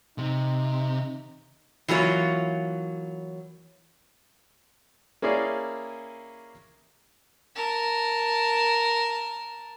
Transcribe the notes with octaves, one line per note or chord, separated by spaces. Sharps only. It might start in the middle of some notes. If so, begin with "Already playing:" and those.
C3 D#4
E3 F#3 A#3 F4 C#5
A#3 C#4 E4 G#4 D5 F5
A#4 A5